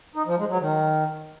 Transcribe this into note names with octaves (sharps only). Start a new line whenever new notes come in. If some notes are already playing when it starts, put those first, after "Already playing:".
D#4
F3
G#3
F#3
D#3